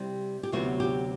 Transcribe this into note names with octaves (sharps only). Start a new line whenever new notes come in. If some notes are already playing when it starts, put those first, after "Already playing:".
Already playing: C3 G3 C4 E4
G4
D2 C3 F#3 B3 E4 F#4
G4